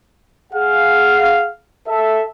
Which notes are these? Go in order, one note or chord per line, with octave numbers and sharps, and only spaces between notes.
G#4 F5 F#5
A4 E5